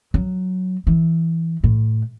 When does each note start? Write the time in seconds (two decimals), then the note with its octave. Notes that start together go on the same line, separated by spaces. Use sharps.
0.14 F#3
0.87 E3
1.64 A2